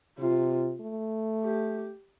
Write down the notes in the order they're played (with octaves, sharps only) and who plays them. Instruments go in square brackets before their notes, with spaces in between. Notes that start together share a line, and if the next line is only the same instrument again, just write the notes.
[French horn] C3 [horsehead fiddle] F4
[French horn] A3
[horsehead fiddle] G4